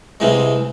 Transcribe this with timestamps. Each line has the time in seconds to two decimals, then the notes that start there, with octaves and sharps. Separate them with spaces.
0.20 C2 C3 E3 G#3